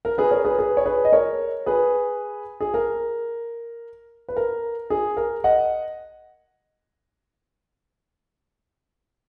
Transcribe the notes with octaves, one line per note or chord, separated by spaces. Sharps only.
A#4
G#4 B4
A#4 C#5
G#4 B4
G#4 B4
C#5
G#4 B4
D#5
A#4 C#5
G#4 B4
G#4
A#4
B4
A#4
G#4
A#4
D#5 F#5